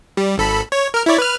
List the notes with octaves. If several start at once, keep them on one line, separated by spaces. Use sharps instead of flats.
G3
G#1 A4 B5
C#5
A#4 F6
E4 C#5 D5
B4 F6